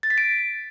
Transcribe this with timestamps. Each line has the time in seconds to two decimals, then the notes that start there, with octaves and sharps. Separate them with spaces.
0.03 A6
0.10 B6
0.18 D7